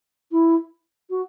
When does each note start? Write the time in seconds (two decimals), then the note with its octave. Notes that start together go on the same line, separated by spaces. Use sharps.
0.32 E4
1.10 F#4